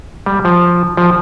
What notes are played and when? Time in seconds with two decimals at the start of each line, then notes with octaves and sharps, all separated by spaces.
0.26 G3
0.45 F3
0.97 F3